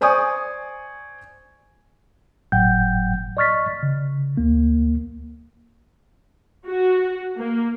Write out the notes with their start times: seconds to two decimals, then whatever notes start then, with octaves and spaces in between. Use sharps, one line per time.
0.01 C5 D5 G#5 C#6 D#6 G6
2.52 G1 A2 F#3 F#5 G5 G6
3.37 D5 D#5 C#6 F6 A6 B6
3.83 C#3
4.37 D2 A#3
6.67 F#4
7.38 A#3